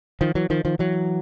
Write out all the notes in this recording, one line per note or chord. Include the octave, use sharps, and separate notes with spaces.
D#3 F3
E3 F#3
D#3 F3
D#3 F3
E3 F#3